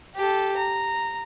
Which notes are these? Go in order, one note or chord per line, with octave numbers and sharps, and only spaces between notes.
G4 A4
A#5